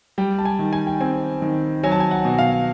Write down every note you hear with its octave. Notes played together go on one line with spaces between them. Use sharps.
G3 G5
A5
G#5
D#3
G#5
G5
C4 G#5
D#3
F#3 G#5
A5
G#5
F#5
B2
F5